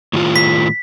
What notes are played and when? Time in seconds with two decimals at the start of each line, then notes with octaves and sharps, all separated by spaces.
0.13 A2 D#3 F4
0.36 B6